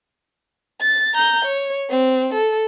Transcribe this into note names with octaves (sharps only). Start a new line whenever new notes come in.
A6
A#5 G6
C#5
C4
A4